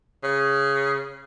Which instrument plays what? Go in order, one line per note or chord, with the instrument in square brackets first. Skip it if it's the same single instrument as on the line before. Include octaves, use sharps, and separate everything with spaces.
[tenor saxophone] C#3